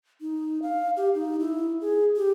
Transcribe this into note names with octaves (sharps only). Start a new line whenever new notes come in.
D#4
F5
G4
D#4
E4
G#4
G4